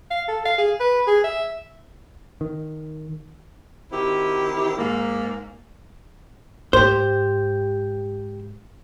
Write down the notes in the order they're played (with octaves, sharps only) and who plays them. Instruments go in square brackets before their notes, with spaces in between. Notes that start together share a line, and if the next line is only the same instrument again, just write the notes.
[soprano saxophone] F5
A4
F5
G#4
B4
G#4
E5
[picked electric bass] D#3
[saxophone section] D#3 C4 E4 F#4 G4
G#2 A#3
[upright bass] G#2 [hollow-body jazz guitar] G4 C5